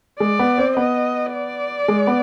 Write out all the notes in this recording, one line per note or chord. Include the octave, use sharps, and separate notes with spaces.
G#3 D5
B3
C4
B3 D#5
D5
G#3
B3